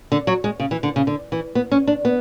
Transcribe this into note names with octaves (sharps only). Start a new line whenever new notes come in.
D3
F#3
G#3
C#3
E3
D3
C#3
D3
E3
B3
C#4
D4
B3